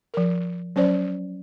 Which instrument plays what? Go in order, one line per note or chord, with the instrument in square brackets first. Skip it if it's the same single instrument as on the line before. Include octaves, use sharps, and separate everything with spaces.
[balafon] F3 A#4
F#3 C#4 C5 D5